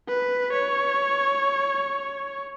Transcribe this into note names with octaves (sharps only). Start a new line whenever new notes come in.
B4
C#5